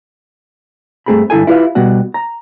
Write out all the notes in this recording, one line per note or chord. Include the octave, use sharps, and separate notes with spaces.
G2 A3 C4 G#4 A#5 B5
G2 D3 E4 A4 G#5
E4 F4 G4 B4 D5 F5
B2 G3 B3 F#4 F#5
A#5